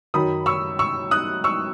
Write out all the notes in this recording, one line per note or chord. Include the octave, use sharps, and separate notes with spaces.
F#2 D#3 F#3 B5 D#6
C#6 E6
C#6 E6
D#6 F#6
C#6 E6